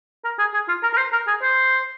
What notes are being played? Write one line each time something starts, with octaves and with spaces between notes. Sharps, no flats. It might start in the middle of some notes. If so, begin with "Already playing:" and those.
A#4
G#4
G#4
F4
A#4
A#4
C5
A#4
G#4
C5